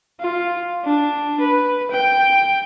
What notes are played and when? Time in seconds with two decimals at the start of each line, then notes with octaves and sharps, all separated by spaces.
0.20 F4
0.84 D4
1.40 B4
1.91 G5